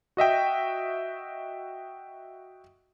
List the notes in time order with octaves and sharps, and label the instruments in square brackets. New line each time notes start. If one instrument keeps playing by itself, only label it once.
[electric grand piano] F#4 D#5 E5 G5